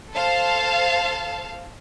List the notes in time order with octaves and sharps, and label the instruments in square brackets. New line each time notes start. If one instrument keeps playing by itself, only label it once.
[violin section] A4 C5 F5 A5